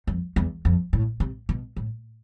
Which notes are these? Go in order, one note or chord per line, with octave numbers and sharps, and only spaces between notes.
F2
E2
F2
A2
C3
B2
A2